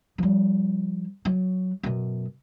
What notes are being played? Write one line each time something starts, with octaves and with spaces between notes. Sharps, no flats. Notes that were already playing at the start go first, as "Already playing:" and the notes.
F3 G3
F#3
F#2 B2